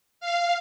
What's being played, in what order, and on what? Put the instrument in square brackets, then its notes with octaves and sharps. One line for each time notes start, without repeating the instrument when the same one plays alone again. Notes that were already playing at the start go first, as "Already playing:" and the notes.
[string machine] F5